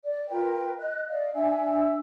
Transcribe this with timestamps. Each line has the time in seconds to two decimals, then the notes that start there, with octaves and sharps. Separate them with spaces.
0.04 D5
0.30 F4 A#4 B4 G5
0.78 D#5 F#6
1.09 D5 D#5 F5
1.34 D4 E5 G#5 E6